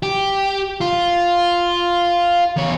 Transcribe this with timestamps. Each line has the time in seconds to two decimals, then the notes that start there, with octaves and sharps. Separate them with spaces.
0.03 G4
0.81 F4
2.56 E2 C#5